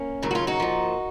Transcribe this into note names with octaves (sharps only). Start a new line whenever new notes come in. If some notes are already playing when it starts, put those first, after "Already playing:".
Already playing: A#3 C#4
D#2 C#3 F#3
F#4
C#4 F4
D#4 F#4
A#2 F3